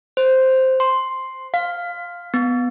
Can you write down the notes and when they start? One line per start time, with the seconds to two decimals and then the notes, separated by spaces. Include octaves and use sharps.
0.17 C5
0.80 C6
1.54 F5
2.34 B3